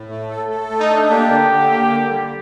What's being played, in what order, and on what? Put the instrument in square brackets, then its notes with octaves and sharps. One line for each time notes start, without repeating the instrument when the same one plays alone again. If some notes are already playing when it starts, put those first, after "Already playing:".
Already playing: [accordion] A2
A3
A4
A4
A3
[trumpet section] D#4
[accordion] D4
[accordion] A#3 [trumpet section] G4
[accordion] D3
D3
A#3
D3
G3